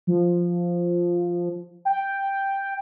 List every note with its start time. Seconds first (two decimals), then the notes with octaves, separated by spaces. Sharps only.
0.07 F3
1.85 G5